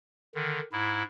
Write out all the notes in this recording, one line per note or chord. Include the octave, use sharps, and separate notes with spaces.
D3 D#3
G#2 E4